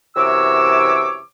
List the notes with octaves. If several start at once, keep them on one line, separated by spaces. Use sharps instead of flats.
F#2 C3 E3 C#5 D6 E6